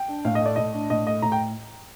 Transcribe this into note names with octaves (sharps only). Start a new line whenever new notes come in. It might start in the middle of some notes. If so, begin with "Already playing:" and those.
Already playing: G5
D4
A2 F5
D#5
A3 D5
A2 D#5
D4
A2 D#5
A3 D#5
A2 A#5
G5